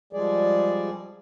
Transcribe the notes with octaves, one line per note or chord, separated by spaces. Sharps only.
F3 G3 G#3 G#4 D5